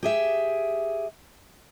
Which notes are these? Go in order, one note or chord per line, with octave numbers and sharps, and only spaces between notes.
G4 G#4 E5